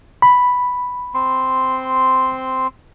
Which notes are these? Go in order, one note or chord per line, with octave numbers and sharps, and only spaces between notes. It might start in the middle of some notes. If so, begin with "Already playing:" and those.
B5
C4 C6